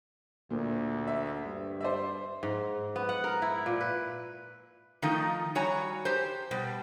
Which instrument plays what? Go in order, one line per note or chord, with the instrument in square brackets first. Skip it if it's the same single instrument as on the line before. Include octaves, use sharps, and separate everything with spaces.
[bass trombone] D2 [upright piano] A#2
[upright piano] E5
[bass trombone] G2
[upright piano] C5 D5 E5
[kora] G#2
B3
F#5
A#4
E4
A#2
B4
[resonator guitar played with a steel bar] D#3 F3 A3 D#4
G3 F#4 C#5 G#5 A#5
G4 C5
B2 G3